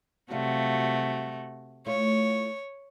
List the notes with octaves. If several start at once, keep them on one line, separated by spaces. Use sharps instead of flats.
C3 F#3 G3 A3 F4 F#4
A3 E4 F4 C#5